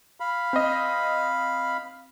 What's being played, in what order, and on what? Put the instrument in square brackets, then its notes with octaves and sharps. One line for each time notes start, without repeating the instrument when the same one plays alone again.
[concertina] F5 B5
[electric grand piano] C4 D#5